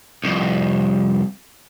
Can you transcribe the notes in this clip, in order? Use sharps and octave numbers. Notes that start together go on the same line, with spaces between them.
C2 F2